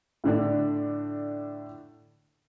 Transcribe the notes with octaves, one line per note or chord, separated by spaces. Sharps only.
A2 D3 D4